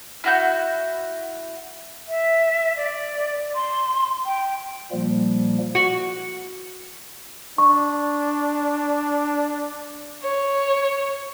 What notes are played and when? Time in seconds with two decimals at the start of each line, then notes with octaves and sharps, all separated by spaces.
0.24 E4 F#4 G6
2.09 E5
2.77 D5
3.55 C6
4.26 G5
4.92 A#2 F3 G3 A#3
5.75 F#4
7.58 D4 C#6
10.23 C#5